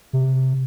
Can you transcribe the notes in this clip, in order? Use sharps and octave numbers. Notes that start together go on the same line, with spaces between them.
C3